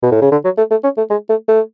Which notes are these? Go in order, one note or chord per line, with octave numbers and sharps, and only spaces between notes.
B2
A2
C#3
D3
F#3
A3
A3
C#4
A3
G#3
A3
A3